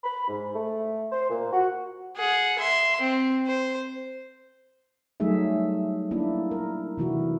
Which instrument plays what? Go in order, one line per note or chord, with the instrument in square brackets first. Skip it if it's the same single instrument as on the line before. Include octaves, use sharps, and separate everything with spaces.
[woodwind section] B5
G#2
A3
C5
A#2
F#4
[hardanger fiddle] G#4 F#5
E5 C6
C4
C5
[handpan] F#3 G3 A3 D#4 G#4 E5
A#3 D4 E4
A#4
C3 E3 E4 F#4